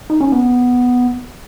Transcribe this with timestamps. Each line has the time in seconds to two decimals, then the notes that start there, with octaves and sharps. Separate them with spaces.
0.10 D#4
0.21 C#4
0.32 B3